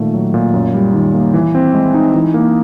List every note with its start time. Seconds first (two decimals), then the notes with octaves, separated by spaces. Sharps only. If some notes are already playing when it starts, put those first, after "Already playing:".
Already playing: A#2 D#3 A3
0.14 F#3
0.34 A#2
0.54 F#2
0.74 G3
0.94 D#3
1.14 A#3
1.34 E3
1.55 C4
1.74 G#3
1.94 D#4
2.14 E3
2.34 A#3